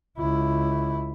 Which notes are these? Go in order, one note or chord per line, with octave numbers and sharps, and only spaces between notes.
C#2 E4